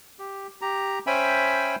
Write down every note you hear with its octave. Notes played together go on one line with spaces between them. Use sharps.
G4
G4 A#5
C#4 C5 E5 G5 G#5 B5